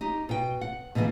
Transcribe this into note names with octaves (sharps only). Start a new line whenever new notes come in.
D#4 G4
B2 G5
F#5
B2 D3 E3 A#3 B3